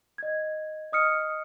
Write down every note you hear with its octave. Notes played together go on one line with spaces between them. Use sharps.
D#5 G#6
D#5 D#6 F6 C#7